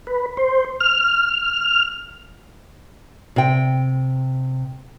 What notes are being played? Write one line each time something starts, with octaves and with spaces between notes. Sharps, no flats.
B4
C5
F6
C3 G5